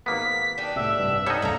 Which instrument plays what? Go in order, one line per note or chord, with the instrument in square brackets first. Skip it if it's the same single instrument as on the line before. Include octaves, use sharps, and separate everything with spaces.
[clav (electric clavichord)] G#1 A#3 B3 [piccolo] B6
[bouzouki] D4 D#4 G4
[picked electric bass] C2 A2 [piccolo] E5
[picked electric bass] C2 G2
[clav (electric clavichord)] G3 D#4 [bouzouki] A4 C#5 F#5
[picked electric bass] D#1 C#2 G2 [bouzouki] A#3 A4 A#5